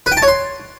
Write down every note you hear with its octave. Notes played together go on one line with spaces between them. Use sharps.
B4
G5
A5
C#5
C6